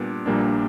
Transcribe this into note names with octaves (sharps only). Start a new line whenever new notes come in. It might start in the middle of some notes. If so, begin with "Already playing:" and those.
Already playing: A#2 G3 B3 D4
A#1 A#2 G3 A#3 D4